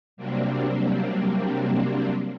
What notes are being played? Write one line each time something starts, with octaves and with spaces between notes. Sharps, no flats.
C3 F#3 G3 A#3 C4 D4